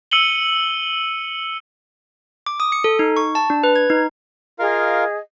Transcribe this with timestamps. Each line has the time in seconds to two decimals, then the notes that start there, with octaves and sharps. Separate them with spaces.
0.11 E6 C#7 D#7 F#7 G7
2.46 D6
2.60 D#6
2.72 C#7
2.84 A4
2.99 D#4
3.17 C#6
3.35 A5
3.50 D4
3.64 B4
3.76 G#6
3.90 D#4
4.59 F4 G#4 A#4 D#5 F5